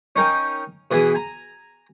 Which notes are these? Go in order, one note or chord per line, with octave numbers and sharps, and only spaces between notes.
C#4 D#4 A#4 G5
B2 E3 G#4 G#5 D#6
G#5 A#5